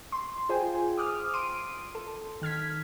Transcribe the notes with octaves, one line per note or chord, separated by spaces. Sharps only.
C6
F4 G#4 C5 G5 G#5
D6 D#6 F6
C6 D7 D#7
A4
D#3 F6 G#6 B6